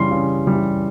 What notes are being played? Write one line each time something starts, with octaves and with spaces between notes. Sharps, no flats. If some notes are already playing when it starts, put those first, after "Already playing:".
Already playing: C#3 E3 G3 C6
C#3
E3 G3